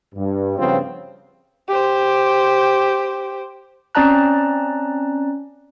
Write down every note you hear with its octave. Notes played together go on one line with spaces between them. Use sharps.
G2
G2 C#3 F3 B3 C4 F4
G4 C5
C4 C#4 D5 A5 A#5 F#6